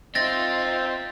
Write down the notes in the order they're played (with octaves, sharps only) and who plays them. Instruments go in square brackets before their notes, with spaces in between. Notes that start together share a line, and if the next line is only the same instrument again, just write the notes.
[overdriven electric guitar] C4 [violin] D#4 F4 [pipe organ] C5 E5 G5 [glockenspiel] A6 A#6